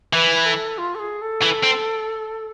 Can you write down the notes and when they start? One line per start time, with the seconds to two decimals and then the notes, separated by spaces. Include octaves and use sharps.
0.13 E3 B4
0.46 A4
0.78 F4
0.95 A4
0.99 G#4
1.21 A4
1.42 E3
1.63 C4